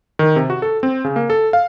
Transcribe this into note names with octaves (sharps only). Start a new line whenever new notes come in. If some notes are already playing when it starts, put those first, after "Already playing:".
D#3
C3
F#4
A4
C4
C#3
A#3
A4
F5